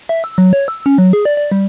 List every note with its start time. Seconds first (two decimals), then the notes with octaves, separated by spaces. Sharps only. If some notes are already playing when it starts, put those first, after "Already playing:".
0.09 E5
0.24 E6
0.38 F#3
0.53 C#5
0.68 E6
0.86 C#4
0.98 F#3
1.13 G#4
1.25 D5
1.37 D5
1.52 G3